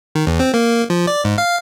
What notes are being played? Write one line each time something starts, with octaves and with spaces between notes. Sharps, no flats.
D#3
E2
C4
A#3
F3
D5
G#2
F5